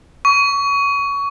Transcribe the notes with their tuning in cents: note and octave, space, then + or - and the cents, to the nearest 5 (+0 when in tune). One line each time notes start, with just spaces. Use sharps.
C#6 +25